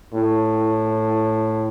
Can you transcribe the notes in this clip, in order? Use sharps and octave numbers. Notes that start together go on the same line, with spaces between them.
A2